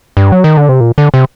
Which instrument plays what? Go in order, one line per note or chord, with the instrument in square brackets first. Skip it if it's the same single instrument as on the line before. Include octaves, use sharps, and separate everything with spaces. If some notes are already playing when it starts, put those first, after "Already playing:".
[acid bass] G2
F#3
D#3
D3
C3
A#2
D3
C3